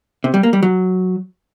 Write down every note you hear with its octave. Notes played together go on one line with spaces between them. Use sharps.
C3
G3
A#3
G3
F#3